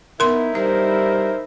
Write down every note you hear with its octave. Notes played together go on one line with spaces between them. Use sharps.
B3 D#4 E4 A#4 C6
G3 A#4 C5 E5